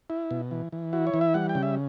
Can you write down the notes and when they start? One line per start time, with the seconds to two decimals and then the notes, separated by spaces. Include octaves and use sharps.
0.10 E4
0.31 B2
0.51 E3
0.72 E3
0.93 E4 F#4
1.07 C#5
1.14 E3
1.21 E5
1.34 G3 F#5
1.49 G5
1.55 C#3
1.63 E5